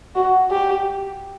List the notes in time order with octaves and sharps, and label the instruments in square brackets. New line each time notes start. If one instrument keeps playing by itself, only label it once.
[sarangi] F#4
G4